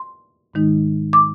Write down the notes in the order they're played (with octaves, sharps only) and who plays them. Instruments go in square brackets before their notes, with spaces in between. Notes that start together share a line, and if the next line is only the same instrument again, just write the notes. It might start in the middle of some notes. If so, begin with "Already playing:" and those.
Already playing: [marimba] C6
G#2 D#3 G#3 D#4
D6